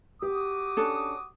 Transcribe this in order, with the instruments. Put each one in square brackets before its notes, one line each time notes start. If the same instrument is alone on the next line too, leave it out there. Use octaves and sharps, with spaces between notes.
[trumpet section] F#4 D6 D#6 [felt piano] G4
[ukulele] C#4 D4 A4